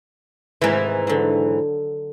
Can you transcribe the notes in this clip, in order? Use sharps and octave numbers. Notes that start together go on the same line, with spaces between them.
G#2 C3 D#3 E3
D3 F#3